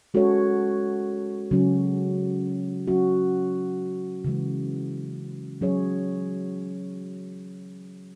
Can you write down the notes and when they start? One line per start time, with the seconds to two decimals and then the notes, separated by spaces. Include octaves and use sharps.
0.14 G#3 C#4 F#4 A4 C#5
1.51 C#3 F#3 C#4 F#4
2.87 F#3 C#4 F#4
4.24 C#3 E3 G#3
5.61 F#3 C#4 G#4 C#5